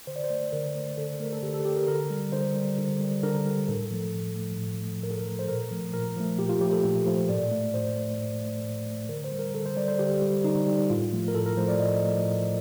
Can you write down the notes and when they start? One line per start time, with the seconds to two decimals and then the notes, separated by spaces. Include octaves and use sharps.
0.07 D3 C5
0.16 D5
0.24 C5
0.30 A3
0.52 D3 A#4
0.75 A3
0.98 D3 A4
1.20 A3 A#4
1.33 A4
1.43 D3 G4
1.54 A4
1.65 A3 G4
1.76 A#4
1.88 D3 A#4
2.10 G3
2.32 D3 C5
2.56 G3
2.78 D3
3.00 G3
3.23 D3 A#4
3.46 G3
3.68 A2 A4
3.91 F3 A3
4.13 A2
4.36 F3 A3
4.58 A2
4.81 F3 A3
5.03 A2 A#4
5.11 A4
5.18 A#4
5.26 F3 A3
5.39 C5
5.48 A#2 A#4
5.71 F3 A3
5.93 A#2 A#4
6.16 F3 A3
6.39 A#2 G4
6.49 F4
6.61 F3 G4
6.65 A3
6.73 A4
6.84 A#2
7.06 F3 A3
7.29 A2 D5
7.51 A3
7.74 A2 C5
7.96 A3
8.19 A2
8.41 A3
8.64 A2
8.87 A3
9.09 D3 A#4
9.24 C5
9.32 G3
9.39 A#4
9.54 D3 A4
9.66 C5
9.77 G3 D5
9.88 C5
9.99 D3 G4
10.22 G3
10.44 D3 D#4
10.67 G3
10.90 A2 F4
11.12 F3 A3
11.28 A#4
11.35 A2 A4
11.46 A#4
11.57 F3 A3 C5
11.68 D5
11.80 A2 D#5
12.02 F3 A3
12.25 A2